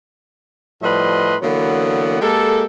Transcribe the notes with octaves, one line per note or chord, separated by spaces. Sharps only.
A2 F3 G3 B4 D#5 C6
D3 E3 F#3 A#3 B3
G#3 A#3 G4 A4